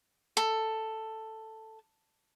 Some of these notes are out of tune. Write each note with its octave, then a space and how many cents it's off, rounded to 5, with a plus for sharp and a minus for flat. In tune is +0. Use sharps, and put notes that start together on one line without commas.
A4 +5